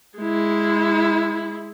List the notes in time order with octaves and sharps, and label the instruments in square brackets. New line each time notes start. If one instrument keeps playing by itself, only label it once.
[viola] G#3 E4